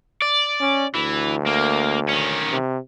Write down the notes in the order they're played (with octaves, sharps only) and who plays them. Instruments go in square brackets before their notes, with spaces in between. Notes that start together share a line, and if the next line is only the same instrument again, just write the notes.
[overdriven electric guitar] D5
[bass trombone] C#4
[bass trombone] D2 [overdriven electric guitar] E3
[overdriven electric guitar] A#3
D#3 C#4
[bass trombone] C3